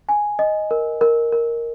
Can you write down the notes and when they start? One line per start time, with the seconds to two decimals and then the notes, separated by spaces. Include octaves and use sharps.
0.09 G#5
0.39 D#5
0.71 A#4
1.01 A#4
1.32 A#4